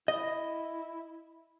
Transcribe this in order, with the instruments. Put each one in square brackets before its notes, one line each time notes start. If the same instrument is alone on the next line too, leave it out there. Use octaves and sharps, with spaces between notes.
[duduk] E4 [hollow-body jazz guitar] D#5